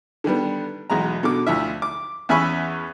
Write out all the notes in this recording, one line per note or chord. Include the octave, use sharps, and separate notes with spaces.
D3 D#3 G3 B3
B1 E2 G#3 A#5
B2 D3 D6
D2 F3 E4 E5
D6
E2 C#4 E5 G#5 B5 C#6